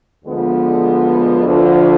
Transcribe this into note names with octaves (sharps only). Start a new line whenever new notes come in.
D2 D3 F3 G#3 B3
D2 D3 F3